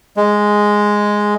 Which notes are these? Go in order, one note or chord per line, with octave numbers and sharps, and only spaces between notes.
G#3